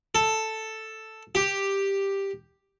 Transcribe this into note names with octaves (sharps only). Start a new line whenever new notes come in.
A4
G4